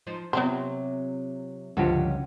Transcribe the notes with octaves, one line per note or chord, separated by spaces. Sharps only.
F3 D#4 C5
C3 F#3 B3 C4 F4 C5
C#2 G2 D3 F3 C#4 F#4 G4 A4